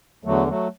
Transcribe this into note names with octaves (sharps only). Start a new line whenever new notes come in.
E2 D3 F#3 A3
F#3 A3